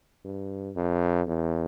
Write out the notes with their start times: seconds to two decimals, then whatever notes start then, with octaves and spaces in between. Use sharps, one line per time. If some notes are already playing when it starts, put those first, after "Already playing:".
0.25 G2
0.76 F2
1.27 E2